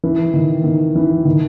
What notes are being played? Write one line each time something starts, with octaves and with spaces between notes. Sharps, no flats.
E3
D#3
D#3
E3
D#3